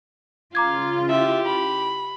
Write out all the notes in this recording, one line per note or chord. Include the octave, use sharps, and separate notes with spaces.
C#3 F4 F5 A#5 D6 G#6
E4 G4 E5
B5